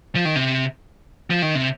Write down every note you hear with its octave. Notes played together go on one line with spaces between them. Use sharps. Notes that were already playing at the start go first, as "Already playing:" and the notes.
F3
D#3
C3
F3
D#3
C3